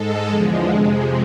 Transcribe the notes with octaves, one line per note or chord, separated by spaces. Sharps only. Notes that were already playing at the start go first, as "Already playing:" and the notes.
Already playing: G#2 G#3 A4
E2 D3 F3 G#3
F2 C3 G#3